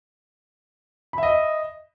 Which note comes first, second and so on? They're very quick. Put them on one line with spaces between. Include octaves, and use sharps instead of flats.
B5 E5 D#5